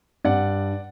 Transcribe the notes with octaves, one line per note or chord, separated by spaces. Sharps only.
G2 D5 F#5